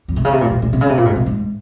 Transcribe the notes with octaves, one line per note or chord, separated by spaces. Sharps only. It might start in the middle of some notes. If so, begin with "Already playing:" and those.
F2
C3
C#3
C3
A#2
A#2
A#2
C3
C#3
C3
A#2
G#2
C3
G#2